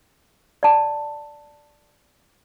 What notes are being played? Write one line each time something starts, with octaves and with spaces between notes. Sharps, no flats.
D5 A5